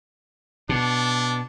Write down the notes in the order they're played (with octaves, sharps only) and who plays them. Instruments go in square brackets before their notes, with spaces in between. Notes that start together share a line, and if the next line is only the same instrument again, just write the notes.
[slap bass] B2 [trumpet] D4